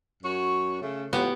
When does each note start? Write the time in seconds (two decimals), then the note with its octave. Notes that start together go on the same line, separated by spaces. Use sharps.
0.23 F#2 F#4 C#5
0.81 C#3 A3
1.13 A2 F3 B3 F#4 G4